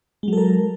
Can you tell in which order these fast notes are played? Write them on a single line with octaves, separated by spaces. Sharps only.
G#3 F#3 A4 A#4